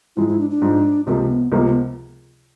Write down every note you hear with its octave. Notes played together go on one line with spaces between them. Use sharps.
G#2 F3 G#3 E4
E4
D4
D4
G#2 F3 G#3
C#2 C3 F3 A#3 C4
B3
C#2 C3 F3 A#3 B3
B3